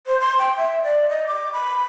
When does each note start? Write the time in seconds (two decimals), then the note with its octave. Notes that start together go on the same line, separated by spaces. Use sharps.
0.06 C5
0.20 C6
0.38 G5
0.57 E5
0.83 D5
1.09 D#5
1.27 D6
1.53 B5